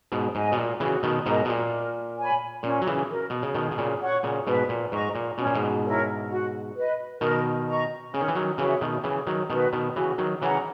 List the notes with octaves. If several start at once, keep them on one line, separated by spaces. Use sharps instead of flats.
G#2 B2
G#2 D#5 G#5
B2
A#2
C#3 E3 F#4
B2 D#3
G#2 B2 A#4 D#5 A#5
B2
A#2
A#4
C#5 G#5 B5
A#2 C#4
F#3
C#3 E3
F#4 A#4
B2
C#3
B2 D#3 G#4
B2
A#2 C#3
C#5 F#5 C#6
A#2 C#3
G#2 B2 B4
A#2
G#2 D#5 A#5 C#6
A#2
B2 C#4
A#2
G#2 B2
E4 A#4 C#5
F#4
B4 D#5
B2 D#3 A#4
D#5 A#5 C#6
C#3 C#4
D#3
E3
D#3 F#3
C#3 E3 F#4 C#5 E5
B2 D#3
C#3 E3 C#4
D#3 F#3
B2 D#3 F#4 B4
B2 D#3
C#3 E3 F#4
D#3 F#3
C#3 E3 C#5 F#5 A#5